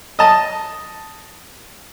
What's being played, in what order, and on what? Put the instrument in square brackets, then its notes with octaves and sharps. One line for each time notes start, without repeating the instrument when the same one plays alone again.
[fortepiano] D#5 A5